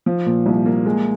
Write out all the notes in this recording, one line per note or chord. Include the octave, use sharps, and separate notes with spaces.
F3
A#2
C2
A#3
G#3